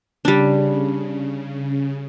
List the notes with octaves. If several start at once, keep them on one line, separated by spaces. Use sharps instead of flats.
C#3 G3 D4